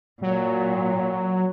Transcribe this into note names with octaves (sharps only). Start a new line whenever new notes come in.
A#2 F#3